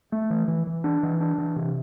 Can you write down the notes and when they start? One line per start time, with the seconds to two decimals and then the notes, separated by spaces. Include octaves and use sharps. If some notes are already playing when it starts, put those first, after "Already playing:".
0.12 A3
0.30 E3
0.48 E3
0.67 E3
0.84 D4
1.03 E3
1.21 D4
1.38 E3
1.56 C3